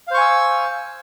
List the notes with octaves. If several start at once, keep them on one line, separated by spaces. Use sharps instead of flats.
C5 F5 G#5 C#6 E6